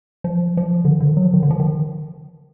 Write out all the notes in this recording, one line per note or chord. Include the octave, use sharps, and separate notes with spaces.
F3
F3
D3
D#3
D3
D#3
F#3
F3
D#3
D3
F3
D#3